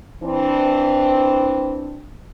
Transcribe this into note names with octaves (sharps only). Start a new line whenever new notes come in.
E3 C4 D4